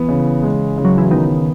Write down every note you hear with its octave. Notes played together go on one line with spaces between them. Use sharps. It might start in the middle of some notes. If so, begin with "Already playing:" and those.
Already playing: E3 B3
C#3
G#3
C#3
F#3
E3
D#3 B3